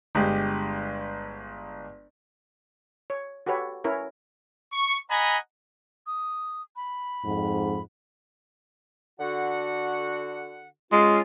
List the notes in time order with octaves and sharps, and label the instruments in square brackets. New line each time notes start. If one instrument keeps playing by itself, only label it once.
[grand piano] G1 G#3 G4
[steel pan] C#5
F#4 G4 A4 B4 C#5
C#4 E4 A#4 B4 C#5
[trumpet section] C#6
D#5 F#5 G#5 A#5 B5
[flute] D#6
B5
[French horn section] F2 G#2
[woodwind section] D3 F#4 F#5
[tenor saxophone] G#3 [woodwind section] C#4 F4